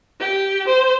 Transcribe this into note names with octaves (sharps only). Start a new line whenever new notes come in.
G4
C5